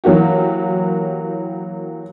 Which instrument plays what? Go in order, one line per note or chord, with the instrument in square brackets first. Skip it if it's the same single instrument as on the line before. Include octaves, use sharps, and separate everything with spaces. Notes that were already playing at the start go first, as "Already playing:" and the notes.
[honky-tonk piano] E3 F#3 A#3 F#4 G4